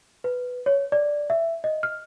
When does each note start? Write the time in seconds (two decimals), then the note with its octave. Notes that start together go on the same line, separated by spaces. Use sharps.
0.24 B4
0.66 C#5
0.92 D5
1.30 E5
1.64 D#5
1.83 F6